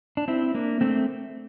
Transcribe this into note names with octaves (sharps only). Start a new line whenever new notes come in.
D4
C4 E4
A#3 D4
A3 C4